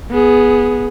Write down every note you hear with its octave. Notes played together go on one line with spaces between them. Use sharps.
B3 G#4